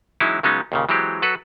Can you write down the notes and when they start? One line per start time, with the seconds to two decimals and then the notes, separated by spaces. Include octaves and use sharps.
0.20 E3 F#3 G#3 C#4 D#4 E4
0.43 C#3 F#3 G#3 B3 C#4 D#4
0.72 D#2 A#2 C#3
0.89 E3 F#3 G#3 C4 G4
1.22 F#3 F#4 A4 B4